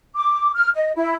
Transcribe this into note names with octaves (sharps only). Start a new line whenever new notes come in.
D6
F6
D#5
E4